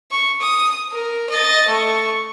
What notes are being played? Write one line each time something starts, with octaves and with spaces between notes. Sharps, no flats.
C#6
D#6
A#4
D#5 A6
A3 C#6